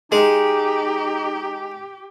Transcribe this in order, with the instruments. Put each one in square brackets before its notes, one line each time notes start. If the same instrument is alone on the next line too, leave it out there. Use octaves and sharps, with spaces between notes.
[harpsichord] G#3 [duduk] D#4 [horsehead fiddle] G4